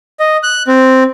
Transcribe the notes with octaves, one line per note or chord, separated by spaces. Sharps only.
D#5
F#6
C4